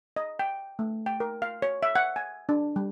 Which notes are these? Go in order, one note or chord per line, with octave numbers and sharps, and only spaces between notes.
D#5
G5
A3
G5
A#4
F5
C#5
E5
F#5
G#5
D4
G3